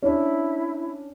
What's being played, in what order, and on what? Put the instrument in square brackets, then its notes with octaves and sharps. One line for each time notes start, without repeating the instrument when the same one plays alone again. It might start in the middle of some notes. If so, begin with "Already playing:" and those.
[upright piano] C#4 D4 [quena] E4